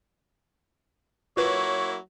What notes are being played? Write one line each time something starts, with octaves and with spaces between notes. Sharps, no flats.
F#3 A#3 E4 F4 B4 C#5